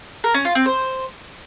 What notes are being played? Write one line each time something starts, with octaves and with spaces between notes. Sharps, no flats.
A#4
C#4
F4
C4
C5